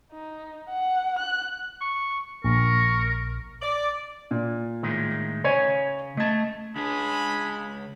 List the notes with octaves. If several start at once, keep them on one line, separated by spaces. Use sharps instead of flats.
D#4
F#5
F#6
C#6
A#1 A#4 C#6
D5
A#2
A2 D#3 G#3
C#3 C#5 G#5
A3 D#5 A5 G#6
C#2 G#3 D4 G#4 B5